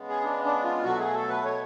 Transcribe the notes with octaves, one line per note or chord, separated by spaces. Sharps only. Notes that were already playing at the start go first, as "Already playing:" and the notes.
Already playing: C#3 G#3 B3
G#4
D4
D4
F4
B2 F#3 A3 F#4
G#4
A4
B4
C#5